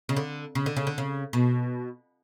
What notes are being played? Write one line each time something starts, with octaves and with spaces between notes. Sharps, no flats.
C#3
D3
C#3
D3
C#3
D3
C#3
B2